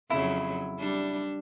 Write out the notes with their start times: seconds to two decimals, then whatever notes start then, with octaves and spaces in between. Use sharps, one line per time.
0.10 F2 C#3 F#3 E4
0.78 G3 D4